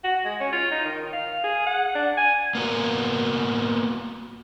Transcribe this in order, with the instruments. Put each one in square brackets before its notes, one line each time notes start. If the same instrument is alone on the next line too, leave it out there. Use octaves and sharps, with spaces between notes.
[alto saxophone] F#4
G#3
C#4
F4
D#4
D#3
F5
G#4
F#5
D4
G#5
[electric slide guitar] A#3 B3 F#4 A#4